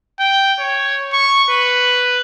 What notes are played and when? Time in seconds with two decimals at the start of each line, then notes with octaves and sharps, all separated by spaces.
0.20 G5
0.60 C#5
1.13 C#6
1.50 B4